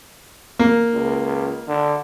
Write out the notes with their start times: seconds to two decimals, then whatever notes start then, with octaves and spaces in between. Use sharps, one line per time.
0.59 A#3
0.93 C#2
1.68 D3